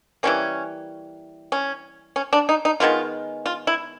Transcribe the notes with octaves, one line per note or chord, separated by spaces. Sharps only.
E3 G3 A#3 C#4
C#4
C#4
D4
D#4
D#4
D#3 G#3 B3 F4
F4
E4